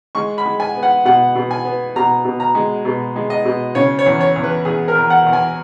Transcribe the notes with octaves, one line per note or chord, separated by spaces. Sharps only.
G#3 C#6
B5
G#3
G#5
B3
F#5
B2 F#5
B2
G#5
B3
B2 A#5
B2
A#5
G#3
B2
G#3
D#5
B2
C#3 C#5
C#5
E2
C#5
E2
B4
E2 G#4
A#4
E2
F#5
E2
G#5